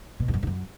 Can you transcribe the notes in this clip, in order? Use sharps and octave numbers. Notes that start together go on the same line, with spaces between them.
B2
E2
F#2
G#2
F#2